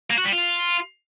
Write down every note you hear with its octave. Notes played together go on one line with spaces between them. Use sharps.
A#3
F#4
G3
F4